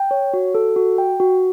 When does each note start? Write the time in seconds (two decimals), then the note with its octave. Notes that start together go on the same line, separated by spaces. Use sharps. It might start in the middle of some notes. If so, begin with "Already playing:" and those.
Already playing: G5
0.11 C#5
0.34 F#4
0.55 A4
0.76 F#4
0.98 G5
1.20 F#4